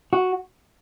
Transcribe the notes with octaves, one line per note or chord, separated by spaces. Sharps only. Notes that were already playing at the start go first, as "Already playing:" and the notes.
F#4